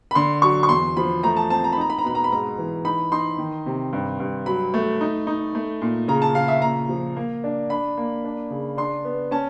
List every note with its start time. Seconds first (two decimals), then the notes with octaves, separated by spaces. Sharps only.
0.11 B5
0.15 D3 C6
0.42 F#3 C#6
0.63 C#6
0.69 E2 C6
0.97 F3 B5
1.23 A3 A#5
1.37 A5
1.50 C4 A5
1.64 A#5
1.72 B5
1.77 D#4 A#5
1.90 B5
1.99 A#5
2.04 B2 B5
2.15 A#5
2.24 B5
2.31 G#2 A#5
2.58 E3
2.85 D#4 B5
3.12 D#4 C6
3.38 D#3
3.66 C3
3.93 G2
4.20 G2
4.46 F#3 B5
4.74 A3
5.01 D#4
5.27 D#4
5.55 A3
5.82 A#2
6.08 C#3 A#5
6.22 A5
6.35 C#3 F5
6.48 E5
6.62 A#2 A#5
6.89 F3
7.17 A#3
7.44 D4
7.70 D4 B5
7.97 A#3
8.25 D4
8.50 C#3
8.77 D4 C6
9.05 B3
9.31 C#4 A5